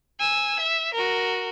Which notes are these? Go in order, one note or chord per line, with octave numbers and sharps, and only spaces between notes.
G#5 E6
E5
F#4 A#4